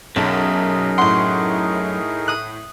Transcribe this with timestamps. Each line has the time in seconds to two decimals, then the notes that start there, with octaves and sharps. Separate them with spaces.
0.16 B1 F#2 D#4 G#4 A#4 A5
0.98 A2 F#5 C6
2.28 D#6 F#6